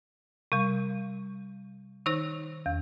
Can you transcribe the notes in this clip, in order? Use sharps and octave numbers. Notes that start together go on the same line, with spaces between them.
C3 G3
D#3 D#4 C5
E2